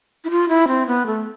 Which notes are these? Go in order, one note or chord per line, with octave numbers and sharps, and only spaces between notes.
E4
F4
E4
C4
B3
A3